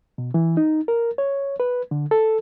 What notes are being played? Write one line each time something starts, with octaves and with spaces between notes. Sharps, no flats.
B2
E3
D#4
A#4
C#5
B4
D3
A4